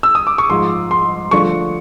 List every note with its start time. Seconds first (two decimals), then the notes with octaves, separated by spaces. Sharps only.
0.03 E6
0.15 D#6
0.27 D6
0.38 C#6
0.50 G#2 F3 G#3 C6
0.91 C6
1.31 D3 F3 A3 D4 C#6